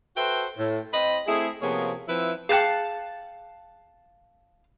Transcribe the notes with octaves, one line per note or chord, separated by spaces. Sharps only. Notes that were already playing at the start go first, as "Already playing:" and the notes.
F#4 A4 B4 C5 E5 G5
A2
C4 D#5 B5
A3 C4 E4 G#4
C3 F3 A#3 B3 G#4 C#5
F3 C4 E4 B4 E5
G#4 F5 G5 A5 F#6